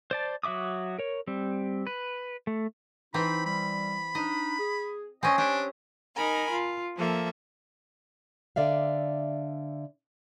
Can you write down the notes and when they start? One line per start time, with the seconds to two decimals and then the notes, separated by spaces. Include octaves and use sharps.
0.11 C5 D5 A5
0.43 F#3 F#4 E5 D6 D#6
0.99 A#4 C#5
1.27 G3 C4
1.87 B4
2.47 A3
3.14 E3 C4 D#4 B5
3.46 G3 B5
4.15 D4 D#4 D#5
4.59 G#4
5.23 C4 C#4 D#5 G#5
5.38 D4 G4 D#5
6.15 D#4 A#4 G#5 B5
6.50 F4
6.97 F3 A#3 A4 E5
8.56 D3 D5 E5 F5